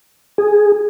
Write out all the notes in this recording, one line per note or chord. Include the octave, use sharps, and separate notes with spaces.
G#4